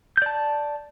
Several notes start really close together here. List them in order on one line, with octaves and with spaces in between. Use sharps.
G6 D5 A5